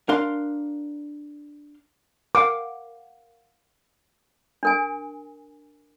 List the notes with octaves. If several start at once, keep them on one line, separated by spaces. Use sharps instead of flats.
D4 A#4 F5 C6
A#4 F5 F#5 D6
D4 A#4 G#5